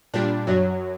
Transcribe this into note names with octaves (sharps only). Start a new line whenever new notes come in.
A#2 G3 D4
F#2 F#3